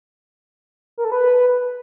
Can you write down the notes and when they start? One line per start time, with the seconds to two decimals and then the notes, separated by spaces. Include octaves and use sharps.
0.98 A#4
1.05 A4
1.12 B4